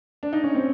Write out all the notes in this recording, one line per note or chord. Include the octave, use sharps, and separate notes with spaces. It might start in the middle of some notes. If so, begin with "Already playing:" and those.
D4
D#4
C#4
C4